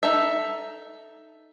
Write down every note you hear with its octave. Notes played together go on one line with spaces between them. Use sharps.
D#4 A4 E5